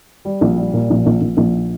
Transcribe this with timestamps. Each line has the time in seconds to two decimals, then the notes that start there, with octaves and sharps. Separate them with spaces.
0.25 G3
0.41 A#1
0.57 G3
0.74 A#2
0.90 A#1
1.06 A#1
1.22 A#1
1.37 A#1